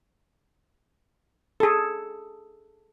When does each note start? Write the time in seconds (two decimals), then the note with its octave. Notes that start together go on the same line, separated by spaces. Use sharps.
1.60 G#4 A4